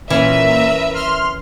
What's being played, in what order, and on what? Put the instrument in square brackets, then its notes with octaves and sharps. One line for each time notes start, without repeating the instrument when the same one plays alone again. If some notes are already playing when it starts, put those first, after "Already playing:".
[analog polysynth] A#2 [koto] E3 C#4 [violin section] A#4 B4 E5
[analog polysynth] C6 F6